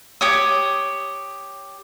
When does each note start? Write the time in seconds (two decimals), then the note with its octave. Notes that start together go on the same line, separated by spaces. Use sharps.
0.21 G4 C#5 D#6